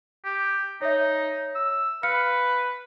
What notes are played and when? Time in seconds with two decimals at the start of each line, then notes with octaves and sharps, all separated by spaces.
0.25 G4
0.82 D#4 C#5 E5
1.55 E6
2.03 B4 F5 F6 C#7